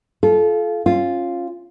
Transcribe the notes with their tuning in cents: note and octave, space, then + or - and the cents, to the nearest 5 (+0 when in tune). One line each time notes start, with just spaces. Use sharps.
F4 -10 A4 -30
C#4 -20 F4 +0